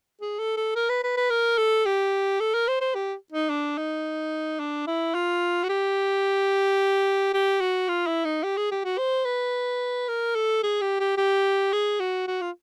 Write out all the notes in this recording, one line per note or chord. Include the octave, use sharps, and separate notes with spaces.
G#4
A4
A4
A#4
B4
B4
B4
A#4
A4
G4
A4
A#4
C5
C5
G4
D#4
D4
D#4
D4
E4
F4
F#4
G4
G4
F#4
F4
E4
D#4
G4
G#4
G4
F#4
C5
B4
A#4
A4
G#4
G4
G4
G4
G#4
F#4
F#4
F4